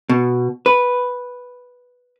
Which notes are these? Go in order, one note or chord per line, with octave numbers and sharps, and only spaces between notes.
B2
B4